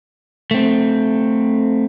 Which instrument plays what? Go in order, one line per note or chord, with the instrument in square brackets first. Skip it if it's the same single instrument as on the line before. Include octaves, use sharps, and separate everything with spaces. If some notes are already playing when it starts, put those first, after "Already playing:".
[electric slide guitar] A3 C4